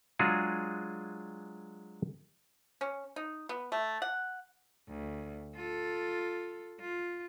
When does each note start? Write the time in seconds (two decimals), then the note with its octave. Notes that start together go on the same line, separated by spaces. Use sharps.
0.19 F#3 G#3 D4 F4 F#4 G#4
2.81 C#4
3.16 D#4
3.49 B3
3.72 A3
4.02 F#5
4.89 D2
5.55 F4 A4
6.80 F4